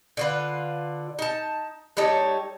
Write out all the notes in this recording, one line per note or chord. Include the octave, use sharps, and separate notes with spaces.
D3 F4 B4
D#4 A5
G3 D#4 A4 C#5